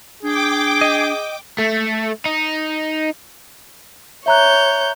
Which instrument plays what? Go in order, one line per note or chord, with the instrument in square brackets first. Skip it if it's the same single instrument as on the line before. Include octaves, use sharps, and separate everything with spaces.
[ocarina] D4 [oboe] G#4 [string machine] G5 D6
[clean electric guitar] D#5
[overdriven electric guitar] A3
D#4
[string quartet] C#5 G6 [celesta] E5 A#5 F#6